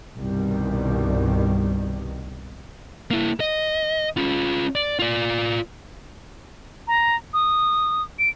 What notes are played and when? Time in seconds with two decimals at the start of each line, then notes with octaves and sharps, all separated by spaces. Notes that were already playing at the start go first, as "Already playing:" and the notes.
0.16 C2 G2 B2 D#3 G3
3.11 A#3 E4
3.40 D#5
4.17 C#4 F4
4.75 D5
4.99 F4 D5
6.88 A#5
7.34 D#6
8.19 D7